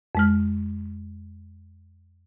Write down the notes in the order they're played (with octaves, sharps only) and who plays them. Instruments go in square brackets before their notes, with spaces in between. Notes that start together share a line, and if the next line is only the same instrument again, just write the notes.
[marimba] F2 G#3 F6